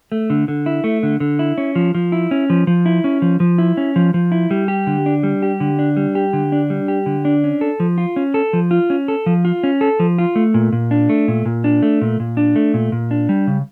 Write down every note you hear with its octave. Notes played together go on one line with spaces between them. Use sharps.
A3
D3
D3
E4
A3
D3
D3
E4
C#4
F3
F3
E4
C#4
F3
F3
E4
C#4
F3
F3
E4
C#4
F3
F3
E4
G3
G4
D3
D4
G3
G4
D3
D4
G3
G4
D3
D4
G3
G4
D3
D4
C#4
A4
F3
F4
C#4
A4
F3
F4
C#4
A4
F3
F4
C#4
A4
F3
F4
A3
A#2
A#2
D4
A3
A#2
A#2
D4
A3
A#2
A#2
D4
A3
A#2
A#2
D4
G3
C#3